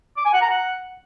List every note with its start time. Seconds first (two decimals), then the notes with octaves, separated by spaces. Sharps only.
0.17 D6
0.25 G#5
0.33 F#5
0.42 A#5
0.50 F#5